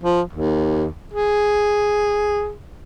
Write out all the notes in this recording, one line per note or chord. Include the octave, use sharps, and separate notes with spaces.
F3
D#2
G#4